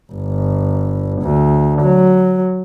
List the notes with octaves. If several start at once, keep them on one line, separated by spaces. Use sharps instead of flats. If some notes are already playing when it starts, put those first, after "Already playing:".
G1
D2
F#3